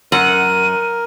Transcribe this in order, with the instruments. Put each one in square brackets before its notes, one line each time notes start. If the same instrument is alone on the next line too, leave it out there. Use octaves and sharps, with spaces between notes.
[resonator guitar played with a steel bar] F#2 [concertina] A#4 [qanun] F#5 [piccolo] D#7